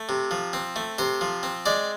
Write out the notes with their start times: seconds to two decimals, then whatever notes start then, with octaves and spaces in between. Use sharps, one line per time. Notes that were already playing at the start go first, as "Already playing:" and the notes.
Already playing: A3
0.09 C3
0.31 F3
0.53 C4
0.76 A3
0.99 C3 C5
1.21 F3
1.43 C4
1.66 G#3 D5